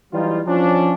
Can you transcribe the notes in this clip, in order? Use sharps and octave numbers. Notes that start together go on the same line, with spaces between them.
E3 F#3 G3 D#4 F4
F3 C#4 D4